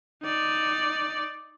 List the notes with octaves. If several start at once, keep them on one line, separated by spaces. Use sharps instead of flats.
D#4 D5